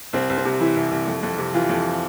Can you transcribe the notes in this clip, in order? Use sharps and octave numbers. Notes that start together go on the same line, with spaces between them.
C2 C4
C2
C4
C3
E3 E4
C2
C2
F2
F2
C3
E3 F4
F2